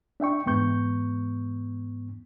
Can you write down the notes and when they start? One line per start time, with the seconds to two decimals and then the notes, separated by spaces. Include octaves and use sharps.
0.20 D4 E5 G5 C#6
0.46 E2 G#2 B3 C#6 G6